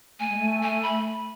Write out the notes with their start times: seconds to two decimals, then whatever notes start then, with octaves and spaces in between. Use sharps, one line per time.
0.20 A3 G#5
0.30 G#3
0.38 A3
0.62 G#5
0.83 B5